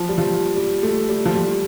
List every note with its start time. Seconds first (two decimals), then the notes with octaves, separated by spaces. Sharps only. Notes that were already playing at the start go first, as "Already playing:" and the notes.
Already playing: F3
0.09 G3
0.18 F3
0.56 G3
0.83 A3
1.09 G3
1.25 F3
1.35 G3